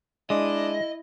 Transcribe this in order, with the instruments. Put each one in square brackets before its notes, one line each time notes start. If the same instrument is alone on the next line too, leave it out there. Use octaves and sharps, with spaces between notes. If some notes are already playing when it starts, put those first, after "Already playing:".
[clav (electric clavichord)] G#3 [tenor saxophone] D4 [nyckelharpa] E4 [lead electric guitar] D#5